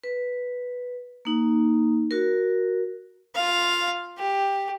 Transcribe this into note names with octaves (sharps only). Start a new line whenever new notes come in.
B4
A#3 D#4
F#4 A#4
F4 F5
G4